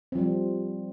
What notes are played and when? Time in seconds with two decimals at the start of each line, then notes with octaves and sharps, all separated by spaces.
0.12 C4
0.15 F3
0.19 G3